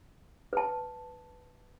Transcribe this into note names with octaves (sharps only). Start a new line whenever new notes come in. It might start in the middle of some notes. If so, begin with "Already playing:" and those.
B4 A5